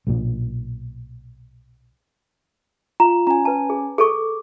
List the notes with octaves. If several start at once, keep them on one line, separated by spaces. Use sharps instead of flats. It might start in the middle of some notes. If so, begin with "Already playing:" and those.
B1 A#2
F4 A#5
C#4 G#5 A#5
B4 A5
G#4
G#4 A4 C#6 D6